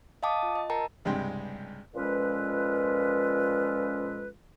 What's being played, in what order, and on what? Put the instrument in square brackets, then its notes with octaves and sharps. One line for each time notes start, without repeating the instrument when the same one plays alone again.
[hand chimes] D#5 F5 G5 A5 D6 D#6
F4
D#5
A#4 G5 A5 A#5
[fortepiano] C#2 G2 C3 G#3 G5 C6
[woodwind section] A#2 F3 G#3 C#4 A4 B4